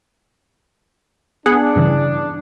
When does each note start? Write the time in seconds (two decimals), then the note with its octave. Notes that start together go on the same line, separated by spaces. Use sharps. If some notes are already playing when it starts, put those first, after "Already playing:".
1.46 B3 D4 G#4 F#5
1.76 G2 C#3 E3